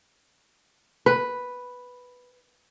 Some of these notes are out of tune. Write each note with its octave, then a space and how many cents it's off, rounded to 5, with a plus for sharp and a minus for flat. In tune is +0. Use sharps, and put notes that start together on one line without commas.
B4 +0